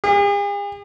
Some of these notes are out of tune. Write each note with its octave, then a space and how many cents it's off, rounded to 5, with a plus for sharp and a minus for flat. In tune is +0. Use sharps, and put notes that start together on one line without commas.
G#4 -45